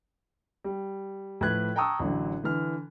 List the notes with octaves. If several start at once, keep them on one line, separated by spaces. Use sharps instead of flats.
G3
A2 F3 B4 F#6 G#6
G5 A5 A#5 C#6 D#6 E6
A1 D3 F#3
D3 E3 F6